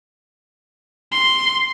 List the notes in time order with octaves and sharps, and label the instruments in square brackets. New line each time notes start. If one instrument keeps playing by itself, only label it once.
[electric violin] C6